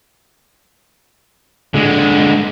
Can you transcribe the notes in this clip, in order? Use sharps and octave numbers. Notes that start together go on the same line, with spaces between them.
D3 G#3